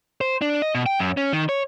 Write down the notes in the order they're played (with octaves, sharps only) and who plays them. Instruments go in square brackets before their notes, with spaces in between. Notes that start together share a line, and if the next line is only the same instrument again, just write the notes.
[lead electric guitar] C5
D4
D#5
B2
G5
F#2
C#4
D#3
C#5